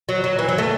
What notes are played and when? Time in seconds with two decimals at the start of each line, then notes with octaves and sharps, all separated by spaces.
0.09 F#3
0.24 F#3
0.39 E3
0.49 F#3
0.58 A3